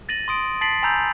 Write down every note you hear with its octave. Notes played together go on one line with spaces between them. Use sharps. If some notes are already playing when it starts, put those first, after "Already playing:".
A6 A#6 D#7 F#7
C6 D#6 D7
A5 A6 B6 C7 D7 F#7
G#5 A#5 B5 E6 G6 F7